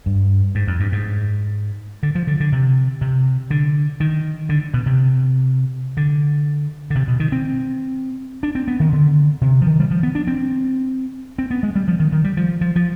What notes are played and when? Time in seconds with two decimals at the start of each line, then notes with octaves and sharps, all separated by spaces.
0.06 G2
0.55 G#2
0.67 F2
0.80 G2
0.92 G#2
2.03 D3
2.15 F3
2.27 D3
2.40 D3
2.52 C3
3.01 C3
3.50 D3
4.00 D#3
4.49 D3
4.74 B2
4.86 C3
5.97 D3
6.90 D3
6.95 C3
7.08 B2
7.20 D#3
7.32 C4
8.43 D4
8.55 C4
8.68 B3
8.80 D#3
8.92 D3
9.41 C3
9.62 F3
9.66 D#3
9.80 G3
9.91 F3
10.03 B3
10.15 D4
10.27 C4
11.38 C4
11.51 B3
11.63 G#3
11.75 G3
11.88 F3
12.00 D#3
12.12 D#3
12.24 G3
12.37 F3
12.61 F3
12.76 F3